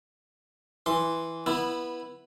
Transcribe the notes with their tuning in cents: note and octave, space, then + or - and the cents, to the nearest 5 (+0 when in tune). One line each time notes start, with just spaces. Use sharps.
E3 +0 C6 +0
B3 -10 E4 +0